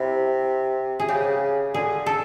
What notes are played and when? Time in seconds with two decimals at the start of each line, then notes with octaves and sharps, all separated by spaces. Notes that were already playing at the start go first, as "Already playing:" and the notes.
Already playing: C3 E4
1.00 G#4
1.09 C#3 G4
1.74 D3 G#4
2.06 A4